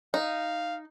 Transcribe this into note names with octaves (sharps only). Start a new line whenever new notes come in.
D#4 F5